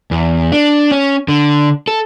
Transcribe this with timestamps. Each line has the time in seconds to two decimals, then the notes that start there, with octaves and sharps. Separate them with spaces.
0.11 E2
0.52 D4
0.91 C#4
1.28 D3
1.88 A4